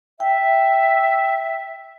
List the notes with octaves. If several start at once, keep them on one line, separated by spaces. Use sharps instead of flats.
E5 G5